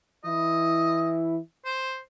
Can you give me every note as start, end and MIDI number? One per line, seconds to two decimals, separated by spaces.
0.24 1.37 52
0.24 1.37 64
0.24 1.14 75
1.65 1.99 72